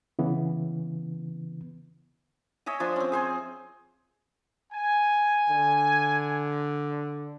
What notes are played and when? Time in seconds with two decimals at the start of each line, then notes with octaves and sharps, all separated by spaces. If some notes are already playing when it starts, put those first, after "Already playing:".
0.19 C#3 E3 B3
2.66 C#5 D#5 E5 G#5
2.80 F3 D4 C6
2.96 C4 C#4
3.12 G#4 C5 G#5
4.73 G#5
5.50 D3